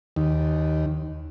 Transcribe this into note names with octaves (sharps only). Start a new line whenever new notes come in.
D#2